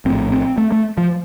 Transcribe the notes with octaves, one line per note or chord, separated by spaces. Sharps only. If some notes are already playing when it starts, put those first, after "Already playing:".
A#1 A2 C4
C4
A3
A3
F3